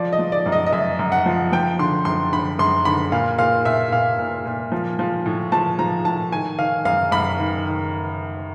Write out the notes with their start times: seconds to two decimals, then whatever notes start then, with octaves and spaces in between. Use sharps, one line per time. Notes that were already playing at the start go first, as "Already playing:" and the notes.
Already playing: F3 D5
0.13 D#5
0.19 F3
0.32 D5
0.46 F#2
0.52 D#5
0.67 D#5
0.72 F#2 E5
0.99 F#2
1.12 F#5
1.26 F3
1.52 F3 G5
1.79 D3 C6
2.05 F#2 C6
2.33 D3 B5
2.59 F#2 C6
2.85 D3 B5
3.12 A#2 F5
3.39 A#2 F5
3.65 A#2 E5
3.92 A#2 F5
4.19 A#2
4.45 A#2
4.72 F3
4.99 F3
5.26 A2
5.52 F3 A5
5.79 F3 A#5
6.05 A2 A5
6.32 D#3 G#5
6.59 D#3 F5
6.85 F#2 F5
7.12 F#2 B5
7.39 D#3
7.65 D#3